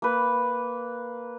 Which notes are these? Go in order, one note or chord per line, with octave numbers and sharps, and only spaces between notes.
A#3 B4